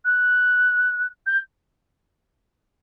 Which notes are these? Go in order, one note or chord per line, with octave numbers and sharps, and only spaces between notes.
F#6
G6